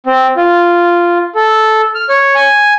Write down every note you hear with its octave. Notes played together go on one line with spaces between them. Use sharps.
C4
F4
A4
F6
C#5
G#5